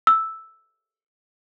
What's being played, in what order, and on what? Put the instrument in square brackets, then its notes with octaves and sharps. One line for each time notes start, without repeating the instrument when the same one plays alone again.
[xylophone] E6